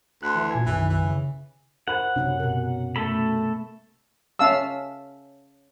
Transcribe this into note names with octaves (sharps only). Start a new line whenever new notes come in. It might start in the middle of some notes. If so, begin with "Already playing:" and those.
D2 C6 F#6
E3
A#2 G#5 G#6
B1 F#2 D#3 E3
E3
C#3
A#4 C5 F#5 B5
F#2 C3 C#4
B2 A#4
A3 A4 B5
C#4 E5 F5 A5 E6